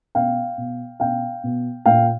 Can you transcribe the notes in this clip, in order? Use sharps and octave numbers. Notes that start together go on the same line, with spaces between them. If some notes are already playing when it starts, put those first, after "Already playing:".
B2 F5 G5
B2
B2 F5 G5
B2
A#2 F5 G5